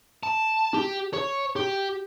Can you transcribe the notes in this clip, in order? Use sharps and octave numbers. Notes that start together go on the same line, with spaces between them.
A5
G4
C#5
G4